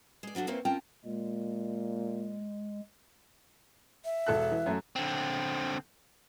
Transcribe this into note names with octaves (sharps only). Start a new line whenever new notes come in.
G#3 D5
F3 F#3 D4 F#4 A4
E2 A#3 C4 C#4 E4 C#5
C4 C#4 F4 A#4 G5 A5
A#2 G#3
E5
E1 A4 F#6
E3
F#2 A3
D3 C4